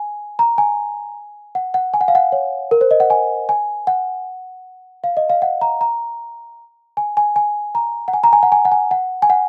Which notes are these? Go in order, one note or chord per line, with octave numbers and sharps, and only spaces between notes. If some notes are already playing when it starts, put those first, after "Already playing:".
Already playing: G#5
A#5
G#5
F#5
F#5
G#5
F#5
F5
F#5
C#5
A#4
C5
D#5
F#5
G#5
G#5
F#5
F5
D#5
F5
F#5
A#5
A#5
G#5
G#5
G#5
A#5
F#5
G#5
A#5
G#5
F#5
G#5
F#5
G#5
F#5
G#5
F#5